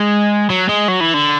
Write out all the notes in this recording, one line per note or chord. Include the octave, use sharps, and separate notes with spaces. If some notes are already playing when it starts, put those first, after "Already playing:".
Already playing: G#3
F#3
G#3
F#3
E3
D3